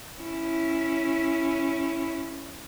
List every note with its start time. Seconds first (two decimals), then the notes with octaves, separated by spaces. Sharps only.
0.21 C#4 E4